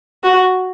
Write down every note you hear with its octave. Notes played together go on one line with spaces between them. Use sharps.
F#4